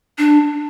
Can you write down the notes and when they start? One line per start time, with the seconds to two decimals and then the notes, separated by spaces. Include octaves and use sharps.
0.18 D4